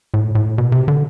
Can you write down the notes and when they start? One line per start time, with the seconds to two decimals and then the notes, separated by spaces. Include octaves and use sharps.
0.14 A2
0.35 A2
0.58 B2
0.72 C3
0.88 D3